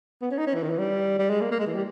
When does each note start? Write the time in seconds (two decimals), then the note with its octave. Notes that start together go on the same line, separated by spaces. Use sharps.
0.22 B3
0.31 C#4
0.38 D#4
0.47 C#4
0.54 E3
0.63 D#3
0.70 E3
0.78 G3
1.19 G3
1.30 G#3
1.41 A#3
1.51 A#3
1.59 G#3
1.67 E3
1.75 G3